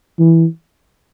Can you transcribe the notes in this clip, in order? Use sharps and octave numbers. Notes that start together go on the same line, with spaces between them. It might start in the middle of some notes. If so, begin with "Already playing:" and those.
E3